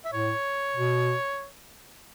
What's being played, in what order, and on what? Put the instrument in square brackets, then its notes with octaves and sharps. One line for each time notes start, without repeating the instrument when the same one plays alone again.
[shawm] E5
[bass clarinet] A2 [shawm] C#5
[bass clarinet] B2